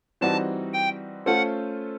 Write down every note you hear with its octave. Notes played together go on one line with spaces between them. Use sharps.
E3 G3 C4 D#4 F#4 A5
G5
A3 C#4 F4 A4 C5 F#5